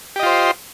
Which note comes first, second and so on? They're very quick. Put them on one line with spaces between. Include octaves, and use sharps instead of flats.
G4 D#5 F4 C5